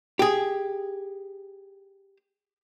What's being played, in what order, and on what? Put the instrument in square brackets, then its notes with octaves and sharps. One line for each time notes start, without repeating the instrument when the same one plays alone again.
[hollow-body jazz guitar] G4 G#4